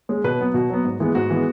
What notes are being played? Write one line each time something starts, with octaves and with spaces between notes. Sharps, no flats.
G#3 C#4
B2 B4
F#3 B3
B2 F#4
F#3 B3
G#2
E3 G#3 B3
G#2 F#4
E3 G#3 B3